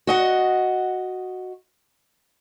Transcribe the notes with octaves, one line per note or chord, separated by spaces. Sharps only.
F#4 D#5 F#5